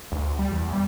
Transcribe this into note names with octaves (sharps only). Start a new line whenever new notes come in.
D2
G3
E2
G3